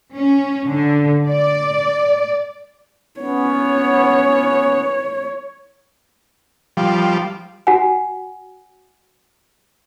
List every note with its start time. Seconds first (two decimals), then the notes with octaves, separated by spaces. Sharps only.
0.16 C#4
0.66 D3
1.28 D5
3.20 B3 C#4 C#5
6.77 F3 G3
7.67 F#4 F#5 G#5